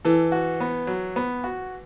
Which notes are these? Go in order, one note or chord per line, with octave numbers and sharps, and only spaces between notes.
E3 A4
F#4
B3
F#3
B3
F#4